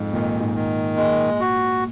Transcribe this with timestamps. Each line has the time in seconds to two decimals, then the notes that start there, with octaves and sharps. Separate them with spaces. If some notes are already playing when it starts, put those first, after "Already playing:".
Already playing: F2 G#2
0.12 A#2 D#3
0.40 G#2
0.55 D#3
0.97 A#2 G#3
1.41 F#4